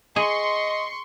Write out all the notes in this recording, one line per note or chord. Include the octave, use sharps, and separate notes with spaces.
G#4 D#5 C6 C#6